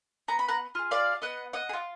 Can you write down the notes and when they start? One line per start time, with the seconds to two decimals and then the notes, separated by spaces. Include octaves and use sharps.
0.28 B3 A#5
0.39 B5
0.48 F#5 A#5
0.75 F4 G#4
0.91 D5 F5
1.22 B3 D#5 F#5
1.53 D#5 F#5
1.69 G#4
1.73 F4